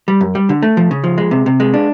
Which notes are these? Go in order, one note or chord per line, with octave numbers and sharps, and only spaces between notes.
G3
F#2
G3
D3
A3
F3
C#3
F3
G#3
C3
C3
G#3
D4